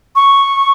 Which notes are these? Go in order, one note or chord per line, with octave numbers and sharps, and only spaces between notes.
C#6